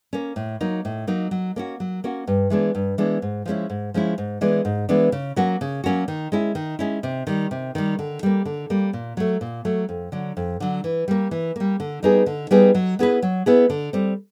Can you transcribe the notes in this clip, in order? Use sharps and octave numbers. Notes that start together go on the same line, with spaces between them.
A#3 C#4
A2
F#3 A#3 D#4
A2
F#3 A#3 D#4
F#3
A#3 C#4 F#4
F#3
A#3 C#4 F#4
G2
E3 G#3 B3 D4
G2
E3 G#3 B3 D4
G#2
F3 G#3 C#4 E4
G#2
F3 G#3 C#4 E4
G#2
E3 G#3 B3 D4
G#2
E3 G#3 B3 D4
C#3
F#3 A#3 C#4 F#4
C#3
F#3 A#3 C#4 F#4
D#3
G#3 C#4 E4
D#3
G#3 C#4 E4
C3
D#3 G3
C3
D#3 G3
D3
G3 A#3
D3
G3 A#3
A#2
F#3 A3
A#2
F#3 A3
F2
D3 F#3
F2
D3 F#3
E3
G3 A#3
E3
G3 A#3
D3
G3 B3 D#4 G#4
D3
G3 B3 D#4 G#4
F#3
B3 E4 G#4 B4
F#3
B3 E4 G#4 B4
D3
G3 C4